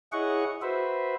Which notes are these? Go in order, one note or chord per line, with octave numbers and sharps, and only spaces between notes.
E4 G#4 C#5 D#5 F#5 C#6
F#4 B4 C5 E5